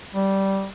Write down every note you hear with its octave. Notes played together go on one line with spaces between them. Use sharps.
G3